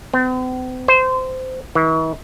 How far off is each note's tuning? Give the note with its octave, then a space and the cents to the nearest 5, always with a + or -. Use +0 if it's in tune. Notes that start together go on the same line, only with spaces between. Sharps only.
C4 -45
C5 -20
E3 -45